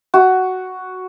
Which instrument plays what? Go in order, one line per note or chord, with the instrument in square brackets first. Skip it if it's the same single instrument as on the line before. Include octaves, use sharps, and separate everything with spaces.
[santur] F#4